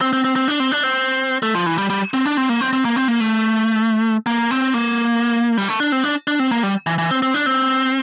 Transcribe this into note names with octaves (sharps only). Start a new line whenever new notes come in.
C4
C4
C4
C4
D4
C4
D4
C4
A3
F3
E3
G3
G3
C4
D4
C4
A#3
C4
C4
A#3
C4
A#3
A3
A#3
C4
A#3
G3
A3
D4
C4
D4
D4
C4
A#3
G3
E3
E3
C4
C4
D4
C4